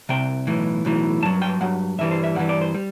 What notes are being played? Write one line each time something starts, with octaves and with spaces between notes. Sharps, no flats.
C2 C3 G5
B1 A2 E3
B1 A2 E3
G2 F#3 A5
G5
G2 F#3 F#5
G2 E3 G3 E5
C5
E5
G2 E3 G3 F#5
D5
C5
G3